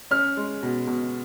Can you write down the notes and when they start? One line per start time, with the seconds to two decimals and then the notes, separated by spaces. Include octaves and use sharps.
0.11 C#4 F6
0.37 G#3
0.63 B2
0.87 B2